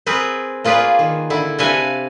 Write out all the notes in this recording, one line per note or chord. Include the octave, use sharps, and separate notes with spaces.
C4 G#4 A#4 B4
A#3 F4 G#4 B4 D5
D#3
D3 E4
C3 D4 A4 B4 F5 G#5